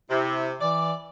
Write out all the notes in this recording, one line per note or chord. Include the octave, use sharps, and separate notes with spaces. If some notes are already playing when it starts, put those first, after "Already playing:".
C3 E4
E3 D5